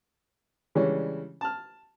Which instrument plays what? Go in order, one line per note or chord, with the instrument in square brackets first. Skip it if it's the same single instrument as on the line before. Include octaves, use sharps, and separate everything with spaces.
[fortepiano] C#3 E3 G3 G#3 C#4 D4
A5 F6